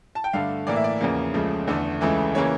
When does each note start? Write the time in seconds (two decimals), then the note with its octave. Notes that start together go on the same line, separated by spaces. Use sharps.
0.15 A5
0.24 G5
0.33 G2 D3 A3 F5
0.67 A2 E3 A#3 D5
0.76 E5
0.84 D5
1.01 E2 C#3 F3 A#3
1.34 C#2 C#3 F3 A3
1.67 E2 D3 A3
2.01 C#2 C#3 E3 A3
2.35 C#3 E3 A#3 C#5